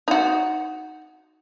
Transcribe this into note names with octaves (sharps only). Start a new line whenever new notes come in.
D#4 F#4